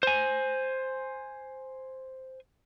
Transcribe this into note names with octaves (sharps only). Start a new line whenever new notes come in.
C5 G#5